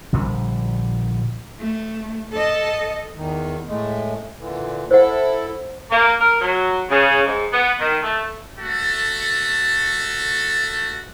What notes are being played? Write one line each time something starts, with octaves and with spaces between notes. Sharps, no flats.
A#1 A#2 D3 G3
A3
A4 D#5
E2 D#3
A2 G#3 A3
A#2 D3 E3
E4 A4 C5 F#5
A#3
A#4
F#3
C#3
G#2
B3
D#3
A3
A3 F#4 A4